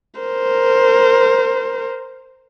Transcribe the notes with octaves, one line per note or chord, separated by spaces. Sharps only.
A#4 C5